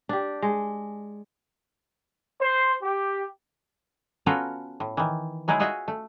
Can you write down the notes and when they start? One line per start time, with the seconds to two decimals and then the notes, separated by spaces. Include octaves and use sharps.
0.09 D4 G4
0.42 G#3
2.40 C5 C6
2.81 G4
4.26 B3 C#4 F4 F#4 A4 A#4
4.80 A2
4.97 D#3 E3
5.48 F#3 G#3 D#4 E4 G#4
5.60 F4 F#4 G#4 D#5 E5
5.88 A3